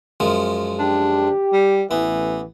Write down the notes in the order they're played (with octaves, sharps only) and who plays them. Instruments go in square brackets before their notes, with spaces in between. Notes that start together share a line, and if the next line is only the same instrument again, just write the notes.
[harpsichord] F#2 F3 G#3
[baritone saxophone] D4 [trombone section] G4
[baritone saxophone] G3
[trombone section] A1 [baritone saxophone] E3 [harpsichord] B3